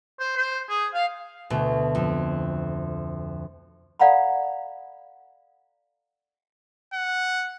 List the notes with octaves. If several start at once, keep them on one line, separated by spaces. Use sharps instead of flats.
C5
C5
G#4
F5
D2 B2 A3
F2
A4 D5 F5 F#5 A#5 B5
F#5